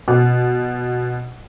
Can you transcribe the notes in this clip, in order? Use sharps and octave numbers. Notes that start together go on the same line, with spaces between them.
B2